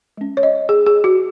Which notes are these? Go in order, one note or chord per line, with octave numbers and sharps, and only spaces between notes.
G#3 C#4
C#5
D#5
G#4
G#4
F#4